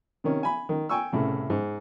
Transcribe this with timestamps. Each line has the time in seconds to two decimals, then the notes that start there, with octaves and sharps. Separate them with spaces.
0.24 C3 D#3 C#4
0.43 G#5 B5
0.69 D#3
0.89 G5 G#5 C#6 E6
1.13 C2 A2 C#3
1.50 G#2